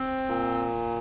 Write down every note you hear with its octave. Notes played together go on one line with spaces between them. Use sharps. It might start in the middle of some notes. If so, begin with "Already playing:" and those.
Already playing: C4
A#2